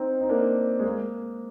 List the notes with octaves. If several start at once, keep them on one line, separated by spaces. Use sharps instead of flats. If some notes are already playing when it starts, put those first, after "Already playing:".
Already playing: C4 D#4
D#4
A#3 D4
G#3
A#3